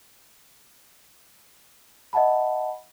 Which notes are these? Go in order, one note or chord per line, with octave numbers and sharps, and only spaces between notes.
D#5 E5 F#5 A5 B5